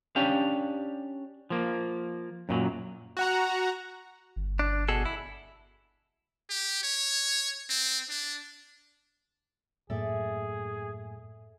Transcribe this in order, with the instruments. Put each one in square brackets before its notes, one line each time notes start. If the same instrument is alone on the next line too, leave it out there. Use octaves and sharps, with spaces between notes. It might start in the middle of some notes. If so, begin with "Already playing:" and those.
[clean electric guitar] C#4 D4 G4 F5
F3 A#3
F#2 A#2 F#3
[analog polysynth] F#4 F#5 A#5
[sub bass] G1
[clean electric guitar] D4
B2 G#4 A4
E4
[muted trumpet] G4
C#5
C4
D4
[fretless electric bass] F#2 A2 A#3 [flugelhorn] G#4 [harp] A4 D5 E5